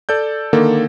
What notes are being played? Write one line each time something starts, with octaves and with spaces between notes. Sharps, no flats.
A4 D5 G6
D3 D#3 A#3 A4